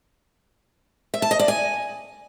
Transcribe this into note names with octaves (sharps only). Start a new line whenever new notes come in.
E5
A5
D#5
D5
G#5